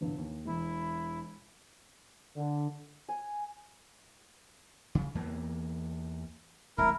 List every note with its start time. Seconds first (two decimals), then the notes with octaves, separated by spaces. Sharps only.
0.01 G1 C2 G2
0.18 D#2
0.45 E1 E4
2.35 D3
3.09 G#5
4.95 C#3
5.15 E2 E3 A#3
6.78 E1 C2 A3 E4 A#4